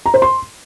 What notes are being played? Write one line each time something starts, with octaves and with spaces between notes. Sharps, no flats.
A#5
C5
C6